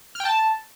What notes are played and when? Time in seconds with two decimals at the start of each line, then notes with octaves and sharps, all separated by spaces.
0.15 F6
0.20 G5
0.25 A5